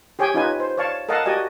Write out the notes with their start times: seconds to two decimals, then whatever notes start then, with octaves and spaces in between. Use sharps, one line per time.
0.19 G4 G#4 C#5 G5 G#5
0.34 C#4 D#4 F4 B4 G#5
0.60 C5
0.77 C#5 D5 F5 A5 C#6
1.09 A4 A#4 D#5 F5 F#5 A5
1.25 F#4 G4 D5 D#5 G#5